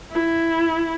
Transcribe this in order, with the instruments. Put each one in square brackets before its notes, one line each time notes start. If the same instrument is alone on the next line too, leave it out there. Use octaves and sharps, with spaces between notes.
[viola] E4